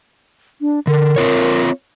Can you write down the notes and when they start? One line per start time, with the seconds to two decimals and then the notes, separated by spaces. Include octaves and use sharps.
0.61 D4
0.87 D3 A#4
1.16 C4 F4 C#5